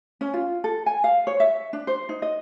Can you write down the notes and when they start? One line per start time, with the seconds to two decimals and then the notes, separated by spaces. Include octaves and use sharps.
0.21 C#4
0.34 F4
0.64 A4
0.86 G#5
1.04 F5
1.27 C#5
1.40 E5
1.73 D4
1.87 C5
2.09 D#4
2.22 D#5